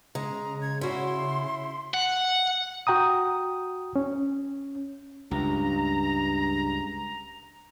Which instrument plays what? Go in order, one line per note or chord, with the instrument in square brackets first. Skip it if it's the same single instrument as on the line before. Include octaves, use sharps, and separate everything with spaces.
[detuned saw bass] C#3 [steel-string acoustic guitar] G#3 [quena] A#5
[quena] G#6
[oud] C#4 F#4 [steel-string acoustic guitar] E4 [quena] C6
[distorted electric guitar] F#5
[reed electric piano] F#4 G5 A#5 D#6
C#4
[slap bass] C#2 [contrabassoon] G2 [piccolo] A#5